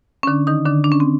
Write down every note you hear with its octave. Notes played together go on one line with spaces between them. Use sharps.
C#4
D3 D4
D#3 D#4
D3 D4
D4
C#4
C4